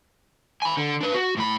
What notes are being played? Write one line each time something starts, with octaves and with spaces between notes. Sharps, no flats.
G#5 B5
D3
D4 B4
F#4
A2 B5